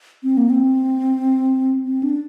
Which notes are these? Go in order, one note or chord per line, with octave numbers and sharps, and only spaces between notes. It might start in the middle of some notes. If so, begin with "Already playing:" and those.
C4
A#3
C4
C4
D4